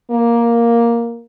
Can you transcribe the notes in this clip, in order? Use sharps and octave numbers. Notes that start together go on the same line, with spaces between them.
A#3